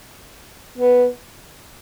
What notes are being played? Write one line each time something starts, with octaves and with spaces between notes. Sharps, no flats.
B3